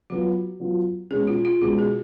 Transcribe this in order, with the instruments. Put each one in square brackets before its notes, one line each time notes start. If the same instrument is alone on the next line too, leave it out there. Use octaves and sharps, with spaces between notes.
[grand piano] F#3 B3 F4 [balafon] F#4
[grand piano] F#3 B3 F4
[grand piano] B2 G#3 C#4 [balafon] G#4
[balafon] F4
F4
[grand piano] B2 G#3 C#4 [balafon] F#4
[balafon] G#4